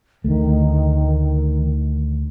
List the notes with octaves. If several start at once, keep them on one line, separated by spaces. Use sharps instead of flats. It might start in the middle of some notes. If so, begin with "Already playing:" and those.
D2 D#3 A3